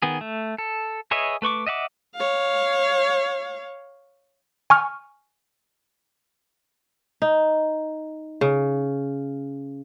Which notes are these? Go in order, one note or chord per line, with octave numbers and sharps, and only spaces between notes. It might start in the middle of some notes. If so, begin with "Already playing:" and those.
D#3 B3 G#4
A3
A4
G#4 B4 C#5 D#5 E5
A3 B4 C#6 D6
D#5 E5 F#5 D6
C#5 F5
G#5 C#6 F6
D#4
C#3